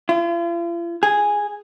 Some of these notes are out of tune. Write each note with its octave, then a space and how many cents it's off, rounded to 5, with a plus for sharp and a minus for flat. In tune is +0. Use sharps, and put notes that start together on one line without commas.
F4 -45
G#4 -5